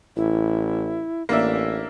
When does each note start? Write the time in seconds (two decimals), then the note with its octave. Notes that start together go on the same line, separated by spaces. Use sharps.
0.16 A1 E4
1.29 A1 A#3 D4 E5